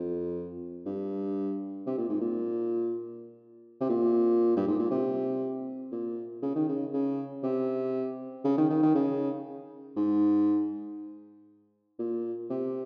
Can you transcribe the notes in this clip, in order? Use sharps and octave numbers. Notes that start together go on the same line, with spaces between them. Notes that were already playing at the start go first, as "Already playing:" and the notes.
Already playing: F2
G2
C3
A#2
G#2
A#2
C3
A#2
G2
G#2
A#2
C3
A#2
C#3
D#3
C#3
C#3
C3
C#3
D#3
D#3
D#3
C#3
G#2
A#2
C3